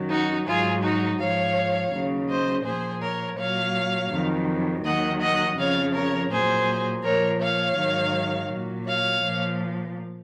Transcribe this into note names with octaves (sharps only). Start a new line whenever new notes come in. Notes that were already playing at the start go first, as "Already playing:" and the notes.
Already playing: F#2 D#3 F#3
D#4 F#4
G#2 F#3 F4 G#4
D#4 F#4
G#2 F3 C#5 F5
D#2 C#3 F#3
C5 D#5
A#2 F3 G#4 C5
A#4 C#5
A#2 F#3 C#5 F5
F2 D#3 F#3
D#2 D#3 F#3 D#5 F#5
D#5 F#5
F2 C#3 F3 C#5 F5
A#4 C#5
A#2 F#3 G#4 C5
A#2 F3 A#4 C#5
C#5 F5
G#2 D#3 F#3
A#2 F#3
C#5 F5
A#2 F3